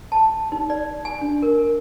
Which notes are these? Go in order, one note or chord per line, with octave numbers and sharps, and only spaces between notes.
A5
D#4
D5
G#5
D4
A#4